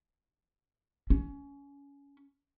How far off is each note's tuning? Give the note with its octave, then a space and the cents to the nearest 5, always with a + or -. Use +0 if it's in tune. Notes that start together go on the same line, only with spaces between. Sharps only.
C#4 +20